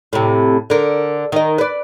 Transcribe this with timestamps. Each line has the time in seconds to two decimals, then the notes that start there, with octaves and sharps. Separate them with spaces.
0.13 A2 C3
0.70 D3 A#4
1.32 D#3 D#5
1.58 B4 D5